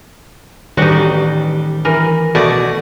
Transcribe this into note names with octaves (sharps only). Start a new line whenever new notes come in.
A1 D#3 G3 D#4 F#4
E3 A#4
B2 A3 F#4 D5 F#5